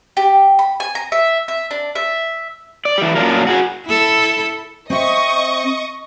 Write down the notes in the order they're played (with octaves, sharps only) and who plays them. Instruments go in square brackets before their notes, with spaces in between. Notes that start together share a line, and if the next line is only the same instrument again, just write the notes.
[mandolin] G4
B5
G#5
A#5
E5
E5
D4
E5
[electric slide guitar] D5
E3 G4
A#2 F#3 C#4 D4 F4 A#4
F#4 G#4
[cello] E4 A4
[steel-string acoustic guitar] C4 C5 E5 [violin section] D#5 C#6 D#6